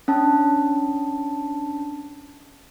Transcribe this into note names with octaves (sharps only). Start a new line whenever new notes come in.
C#4 D4 A5